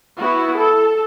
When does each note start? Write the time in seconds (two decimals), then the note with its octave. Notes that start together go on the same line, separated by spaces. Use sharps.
0.19 B3 E4 F#4
0.58 A4